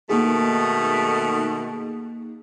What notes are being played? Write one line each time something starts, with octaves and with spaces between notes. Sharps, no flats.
B2 D#3 A3 A#3 D#4 G#4